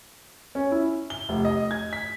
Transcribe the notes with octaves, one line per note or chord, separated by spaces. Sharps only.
C#4
E4
G7
F1
D#5
G#6
B6